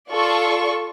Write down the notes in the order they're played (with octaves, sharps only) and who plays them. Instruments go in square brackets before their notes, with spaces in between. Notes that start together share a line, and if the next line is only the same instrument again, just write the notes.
[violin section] F4 A4 D5 C#6